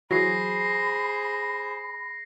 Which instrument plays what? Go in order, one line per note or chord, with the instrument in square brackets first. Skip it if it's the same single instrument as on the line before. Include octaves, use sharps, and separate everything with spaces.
[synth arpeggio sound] E3 F#3 [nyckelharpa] G#4 C5 [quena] B5 [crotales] A#6 C7